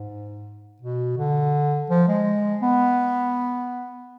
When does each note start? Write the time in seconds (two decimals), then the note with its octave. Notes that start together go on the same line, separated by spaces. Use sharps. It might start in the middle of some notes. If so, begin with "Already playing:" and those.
Already playing: G#2
0.82 B2
1.18 D3
1.90 F3
2.08 G#3
2.62 B3